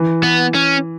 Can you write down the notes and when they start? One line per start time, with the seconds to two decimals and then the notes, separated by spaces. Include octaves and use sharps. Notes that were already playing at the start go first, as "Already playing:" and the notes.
Already playing: E3
0.23 B3
0.55 C#4